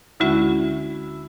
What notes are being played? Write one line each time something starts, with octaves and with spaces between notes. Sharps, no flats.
D2 D3 G#3 C#4 E4 F#4